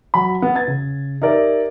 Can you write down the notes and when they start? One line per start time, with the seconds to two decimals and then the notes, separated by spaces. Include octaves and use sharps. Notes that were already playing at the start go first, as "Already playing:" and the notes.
0.14 F#3 B5
0.42 B3
0.56 G#6 A6
0.67 C#3
1.22 D#4 G4 A#4 D5 E5